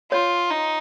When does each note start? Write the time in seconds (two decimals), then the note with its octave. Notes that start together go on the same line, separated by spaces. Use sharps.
0.11 F4 C#5
0.50 D#4